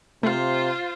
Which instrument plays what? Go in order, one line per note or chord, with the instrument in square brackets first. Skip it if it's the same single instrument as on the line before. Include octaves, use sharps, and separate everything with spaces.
[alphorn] C3 [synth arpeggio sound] A3 F5 [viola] F4 C5